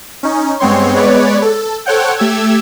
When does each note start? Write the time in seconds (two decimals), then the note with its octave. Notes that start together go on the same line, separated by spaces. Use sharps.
0.23 C#4 D#4
0.60 G2 G#3 B3 C4 C#5 C6
0.95 G#3 B3 B4 C#5 D5
1.42 A4
1.86 A4 C5 C#5 F#5 G5
2.18 A3 G4 E6 G#6